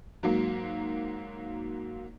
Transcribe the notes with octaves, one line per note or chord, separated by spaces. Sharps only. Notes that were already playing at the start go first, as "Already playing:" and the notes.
G#2 F#3 A#3